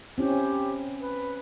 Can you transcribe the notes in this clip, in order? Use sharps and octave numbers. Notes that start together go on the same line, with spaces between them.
C4 C#4 E4 G4
B4